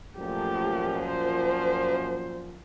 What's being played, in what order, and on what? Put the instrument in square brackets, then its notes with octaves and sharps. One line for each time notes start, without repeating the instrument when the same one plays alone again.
[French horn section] F#2 A#2 F3 [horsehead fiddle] A3 G4
[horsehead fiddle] C5